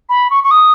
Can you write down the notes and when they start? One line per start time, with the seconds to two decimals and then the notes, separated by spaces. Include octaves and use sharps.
0.09 B5
0.30 C#6
0.44 C#6
0.51 D#6